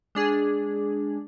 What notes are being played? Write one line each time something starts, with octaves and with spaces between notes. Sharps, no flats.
G#3 D4 G#4